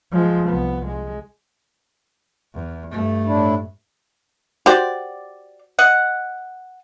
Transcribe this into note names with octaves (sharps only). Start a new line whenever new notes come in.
F3 G#3
C2 B3
G#3
E2
G2 A3
A2 D4 E4
F#4 G4 C5 D5
D#5 F#5